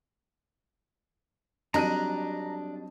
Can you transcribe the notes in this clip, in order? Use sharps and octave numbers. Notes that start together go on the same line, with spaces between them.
F2 F#3 G3 D4 D#4 A#5 F#6 D#7